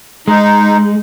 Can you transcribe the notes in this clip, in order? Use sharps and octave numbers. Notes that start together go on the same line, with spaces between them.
G#3 D#4